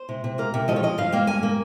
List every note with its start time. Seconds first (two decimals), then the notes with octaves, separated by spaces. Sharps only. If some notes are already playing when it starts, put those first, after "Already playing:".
Already playing: C5
0.09 C3
0.24 C3
0.38 A#3 A#4
0.54 C3
0.68 F3 D#5
0.76 C#5
0.83 F3 D#5
0.98 G2 F5
1.12 A#3 G5
1.27 G2 G#5
1.43 A#3